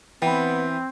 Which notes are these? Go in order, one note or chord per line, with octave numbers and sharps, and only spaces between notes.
E3 B3 C4 G5 B5